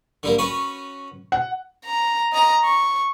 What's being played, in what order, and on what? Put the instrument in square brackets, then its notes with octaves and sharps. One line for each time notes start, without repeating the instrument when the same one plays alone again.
[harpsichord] D3 G3 A#3
C#4 F#4 B4
[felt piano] F#5
[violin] A#5
D#5 A#5
C#6